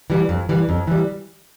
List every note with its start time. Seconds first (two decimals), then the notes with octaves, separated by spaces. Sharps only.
0.10 E3 G3
0.29 F2
0.49 E3 G3
0.69 F2
0.87 E3 G3